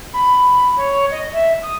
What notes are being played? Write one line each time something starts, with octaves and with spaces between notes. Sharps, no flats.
B5
C#5
D#5
E5
D#6